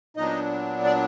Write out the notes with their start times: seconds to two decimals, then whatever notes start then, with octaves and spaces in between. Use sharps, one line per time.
0.17 A#2 F#3 B3 D4 D#4 D#5
0.85 D5